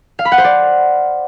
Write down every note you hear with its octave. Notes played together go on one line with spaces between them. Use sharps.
F5
B5
F#5
C5
D5